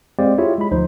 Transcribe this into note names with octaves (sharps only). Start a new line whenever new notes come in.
G#3 C4 G4 C5 D5 F5
E4 F4 G4 G#4 C#5 E5
G#3 B5
D2 F3 D#4 C5